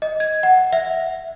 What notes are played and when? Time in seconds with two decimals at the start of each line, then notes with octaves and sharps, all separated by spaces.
0.02 D#5
0.20 G#6
0.43 F#5
0.73 E5